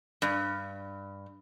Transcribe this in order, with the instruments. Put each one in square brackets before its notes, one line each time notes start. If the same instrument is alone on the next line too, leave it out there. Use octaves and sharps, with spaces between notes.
[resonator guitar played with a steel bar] G2